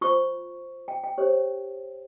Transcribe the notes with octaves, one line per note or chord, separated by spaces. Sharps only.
F4 C5 C#6
G5
G5
G4 C5 C#5